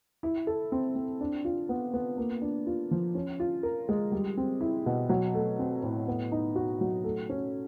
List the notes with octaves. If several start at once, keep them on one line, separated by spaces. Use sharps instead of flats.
E4
A4
C4
C4
D4
F4
B3
B3
A#3
D4
F4
F3
C#4
F4
A#4
G#3
G3
C4
E4
B2
F#3
A3
C4
A2
B3
D#4
F#4
F#3
A3
C#4